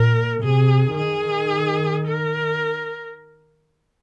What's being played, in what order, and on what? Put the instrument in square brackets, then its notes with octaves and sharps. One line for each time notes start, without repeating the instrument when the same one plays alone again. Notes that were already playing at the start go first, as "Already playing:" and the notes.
Already playing: [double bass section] A#2 [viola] A#4
[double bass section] C3 [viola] G#4
[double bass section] D#3 [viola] G#4
[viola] A#4